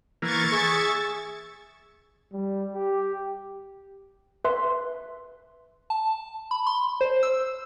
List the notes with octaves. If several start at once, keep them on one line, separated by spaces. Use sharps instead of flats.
E3 A#3 C#6 G#6 A6
G#4 E5
G3
G4
B4 E5 C6
A5
B5
C6
C5
E6